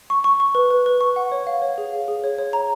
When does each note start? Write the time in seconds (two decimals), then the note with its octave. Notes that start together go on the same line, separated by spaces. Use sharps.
0.10 C#6
0.24 C#6
0.40 C#6
0.55 B4
0.71 B4
0.86 B4
1.01 C#6
1.16 F#5
1.32 C#5
1.47 F5
1.62 C#5
1.78 G#4
1.93 F5
2.08 G#4
2.24 C#5
2.38 C#5
2.53 A#5